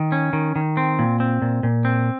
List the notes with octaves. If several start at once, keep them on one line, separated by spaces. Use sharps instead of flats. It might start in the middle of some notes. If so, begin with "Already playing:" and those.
Already playing: D#3
C#4
D#3
D#3
C4
A#2
C4
A#2
A#2
C4